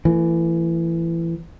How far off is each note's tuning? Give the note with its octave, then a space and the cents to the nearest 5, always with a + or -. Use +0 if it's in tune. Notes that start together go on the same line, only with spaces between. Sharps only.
E3 +20 A3 +45